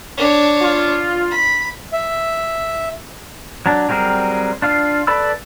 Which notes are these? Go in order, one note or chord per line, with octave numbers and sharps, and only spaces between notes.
D4 C#5
F4
B5
E5
F#3 D4
F#3 G3 C4 G#4 A#4
D4 F4 F5
A4 B4 D5 B5 E6